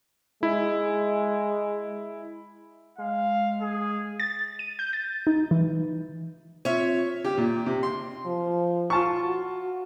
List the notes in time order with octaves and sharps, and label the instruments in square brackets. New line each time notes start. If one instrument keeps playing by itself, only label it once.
[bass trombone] G#3 [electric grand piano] E4
[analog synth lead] G#3 [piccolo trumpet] F5
[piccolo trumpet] G#4
[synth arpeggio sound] A6
D#7
G6
A6
D#4
E3
[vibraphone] C4 F4 [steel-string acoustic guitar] C#5 E5
[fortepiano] G4
A#2
C3
C6
[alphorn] F3
[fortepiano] F4 A5 C#6
[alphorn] F#4